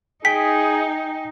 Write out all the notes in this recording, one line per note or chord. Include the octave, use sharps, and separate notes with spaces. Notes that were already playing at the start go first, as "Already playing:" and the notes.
D#4 G#4 G5 G#5 G6 B6